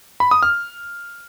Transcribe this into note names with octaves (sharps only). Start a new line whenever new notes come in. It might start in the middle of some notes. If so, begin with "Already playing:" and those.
B5
D#6
F6